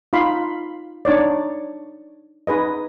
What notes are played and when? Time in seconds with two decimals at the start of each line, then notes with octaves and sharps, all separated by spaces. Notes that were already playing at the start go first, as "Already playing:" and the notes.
0.13 D#4 F4 F5 B5 C6
1.05 D4 D#4 C#5 D5
2.47 D#4 G#4 B4 D#5